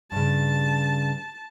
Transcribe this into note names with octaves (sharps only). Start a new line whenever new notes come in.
G2 C#3 A5